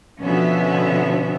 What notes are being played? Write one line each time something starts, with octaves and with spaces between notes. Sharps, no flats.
B2 D3 F3 B3 C#4 E5